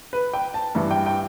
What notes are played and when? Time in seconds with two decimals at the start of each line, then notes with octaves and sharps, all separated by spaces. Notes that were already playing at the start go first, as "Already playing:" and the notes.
0.13 B4
0.34 G5
0.54 A5
0.75 G2 E3
0.91 G5
1.06 G5